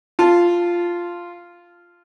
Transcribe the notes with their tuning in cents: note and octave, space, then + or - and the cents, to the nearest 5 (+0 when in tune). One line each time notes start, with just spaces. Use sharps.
F4 -5 A5 +0